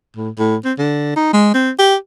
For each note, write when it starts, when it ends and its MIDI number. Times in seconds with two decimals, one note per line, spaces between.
0.16 0.30 45
0.39 0.56 45
0.65 0.73 60
0.78 1.14 50
1.16 1.31 63
1.33 1.54 56
1.54 1.71 60
1.79 1.95 67